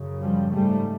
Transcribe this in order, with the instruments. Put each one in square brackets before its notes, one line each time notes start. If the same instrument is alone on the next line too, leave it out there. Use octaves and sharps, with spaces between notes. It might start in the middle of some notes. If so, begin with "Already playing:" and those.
Already playing: [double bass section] F#2 C#3
F3 G3
G#2 G3 A3